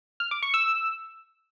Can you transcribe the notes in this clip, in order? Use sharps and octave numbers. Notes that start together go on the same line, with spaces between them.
F6
D6
C#6
E6